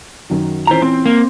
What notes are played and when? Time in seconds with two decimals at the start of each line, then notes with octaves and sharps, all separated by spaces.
0.30 F#2 D#3 F#3
0.67 A#2 E3 C#4 C5 A#5
0.82 C4
1.06 A#3